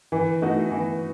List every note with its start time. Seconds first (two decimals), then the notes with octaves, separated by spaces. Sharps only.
0.12 E3
0.41 A3 D#4 F#4
0.71 E3